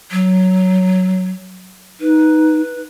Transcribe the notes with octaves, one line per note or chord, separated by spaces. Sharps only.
F#3
D#4 B4